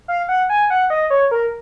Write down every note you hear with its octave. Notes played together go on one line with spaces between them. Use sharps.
F5
F#5
G#5
F#5
D#5
C#5
A#4